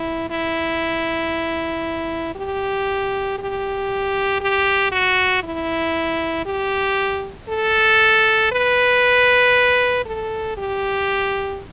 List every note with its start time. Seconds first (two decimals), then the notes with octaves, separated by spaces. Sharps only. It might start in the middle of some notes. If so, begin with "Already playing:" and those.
Already playing: E4
0.30 E4
2.35 G4
3.38 G4
4.41 G4
4.92 F#4
5.43 E4
6.46 G4
7.49 A4
8.52 B4
10.05 A4
10.57 G4